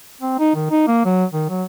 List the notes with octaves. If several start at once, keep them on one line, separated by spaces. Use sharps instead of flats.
C4
D#4
D#3
D#4
A#3
F#3
D#3
F#3